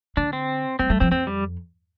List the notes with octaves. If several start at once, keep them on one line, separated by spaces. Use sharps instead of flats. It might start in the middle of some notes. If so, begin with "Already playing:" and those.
D3 D4
C4
G3 C4
G3 A3
F3 C4
F2 C4
G3